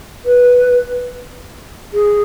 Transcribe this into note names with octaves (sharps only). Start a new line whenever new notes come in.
B4
G#4